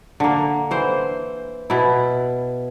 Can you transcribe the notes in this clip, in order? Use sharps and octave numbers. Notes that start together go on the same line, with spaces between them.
D3 A#3
E3 C5
B2 E4